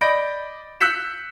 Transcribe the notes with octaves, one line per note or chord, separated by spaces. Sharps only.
D5 D#5 B5 G6 A#6 D7
E6 F#6 G6 B6 C#7 E7